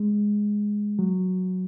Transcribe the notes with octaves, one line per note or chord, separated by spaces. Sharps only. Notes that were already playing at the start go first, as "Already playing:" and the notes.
Already playing: G#3
F#3